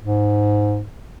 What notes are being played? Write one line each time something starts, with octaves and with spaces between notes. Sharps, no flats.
G#2